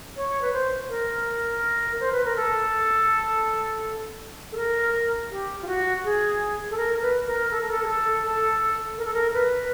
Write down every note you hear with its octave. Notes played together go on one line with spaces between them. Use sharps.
C#5
B4
C5
A#4
C5
B4
A#4
A4
A4
A#4
G4
F4
F#4
G#4
A4
A#4
B4
A#4
A4
A#4
A4
G#4
A4
A4
A#4
A4
A#4
B4